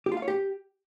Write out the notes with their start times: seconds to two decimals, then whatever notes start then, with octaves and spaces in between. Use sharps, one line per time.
0.06 G4
0.12 F4
0.17 F5
0.22 C#5
0.28 G4